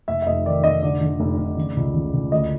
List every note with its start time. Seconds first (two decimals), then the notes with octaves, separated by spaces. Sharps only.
0.08 F1 E5
0.22 E5
0.27 F1 D#5
0.46 D#3 D5
0.64 F1 D#5
0.82 D3 D5
1.01 D3
1.20 F1
1.38 F1
1.57 C#3
1.77 C#2
1.94 C#3
2.14 C#2
2.32 D2 D#5